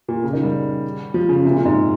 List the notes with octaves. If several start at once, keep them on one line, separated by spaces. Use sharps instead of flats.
A#2
C#3
D#3
G3
F3
C#3
C3
A#2
C3
G#2